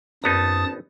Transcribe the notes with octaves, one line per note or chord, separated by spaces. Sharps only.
G#1 F#2 B3 D#4 A5 D#6